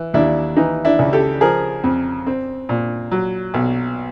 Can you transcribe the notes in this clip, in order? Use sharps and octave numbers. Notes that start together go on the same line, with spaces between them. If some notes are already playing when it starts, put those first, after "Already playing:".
Already playing: E3
D#2 D4 E4
E3 D#4
D4 E4
C#2
G4 A4
F3 G#4 A#4
F2
C4
A#2
F#3
B1